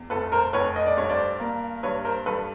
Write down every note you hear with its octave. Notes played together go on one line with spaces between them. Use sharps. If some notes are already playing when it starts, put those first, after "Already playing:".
Already playing: E2
F1 A4 B4
A#4 C5
F1 B4 C#5
D#5
D5
G2 C#5
C5 D5
A#3
G2 B4 C#5
A#4 C5
G2 A4 B4